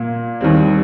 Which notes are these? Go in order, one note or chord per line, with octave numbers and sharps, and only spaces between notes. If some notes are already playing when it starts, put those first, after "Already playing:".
Already playing: A#2 A#3
D#2 D#3 G3 C4